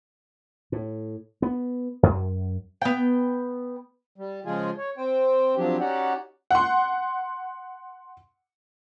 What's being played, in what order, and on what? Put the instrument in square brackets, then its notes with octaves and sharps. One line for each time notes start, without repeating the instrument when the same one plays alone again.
[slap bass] A2
B3
F#2
[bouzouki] B3 G5
[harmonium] G3
C#3 F3 G#3 F4 G#4
C#5
C4 C5 G5
F3 F#3 C4 D4 G4
C#4 D#4 F#4 G4 D5 F#5
[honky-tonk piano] F#5 C6